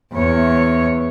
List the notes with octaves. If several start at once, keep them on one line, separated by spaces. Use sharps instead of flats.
E2 C#5